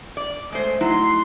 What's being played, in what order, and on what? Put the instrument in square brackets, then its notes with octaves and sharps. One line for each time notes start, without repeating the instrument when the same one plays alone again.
[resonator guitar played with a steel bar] D5
[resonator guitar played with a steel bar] G#3 C5 [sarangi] A3
[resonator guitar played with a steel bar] F#3 [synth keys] A3 D#4 E4 [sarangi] C6